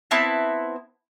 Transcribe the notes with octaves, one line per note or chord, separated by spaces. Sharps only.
B3 C4 E4 A5